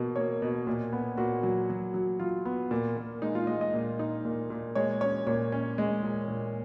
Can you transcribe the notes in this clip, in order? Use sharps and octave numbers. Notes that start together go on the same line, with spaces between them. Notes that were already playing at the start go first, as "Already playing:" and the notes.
Already playing: B2 A#3
A#3 C#5
B2
A#2
B3
A#2 F#4
F#3
F#3
F#3
F#3 F4
B3
A#2
A#2
G#3 D#4
F4
G#3 D#5
D#5
A#2
D#4
A#2
A#2
G#3 C#5
C#4 C#5
A#2 C#5
C#4
G#3
A#2
A#2